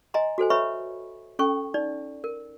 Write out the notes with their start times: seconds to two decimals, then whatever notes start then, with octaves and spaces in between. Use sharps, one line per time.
0.14 D#5 G#5 A#5 C6
0.38 F#4 A4 C5 G#5
0.50 B4 C#5 E5 B5 C#6
1.39 C#4 A4 G5 C#6
1.74 D#4 D5
2.24 A#4